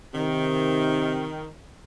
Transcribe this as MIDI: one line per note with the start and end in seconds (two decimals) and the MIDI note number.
0.14 1.30 48
0.14 1.49 51